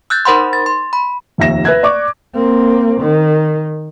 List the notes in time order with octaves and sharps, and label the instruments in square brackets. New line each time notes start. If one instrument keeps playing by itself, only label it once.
[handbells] E6 F#6 G6 A6
D#4 A#4 C5 F#5 B5 C6
A6
C6
B5
[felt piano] F1 D#2 E5 A#6 E7
B4 E5 F#6 G#6
D5 C#6 D6
[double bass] A#3 C4
D#3